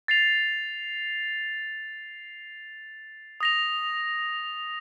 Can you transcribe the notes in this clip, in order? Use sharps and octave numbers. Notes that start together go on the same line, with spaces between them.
A6 C7 F7
D#6 A#6 F7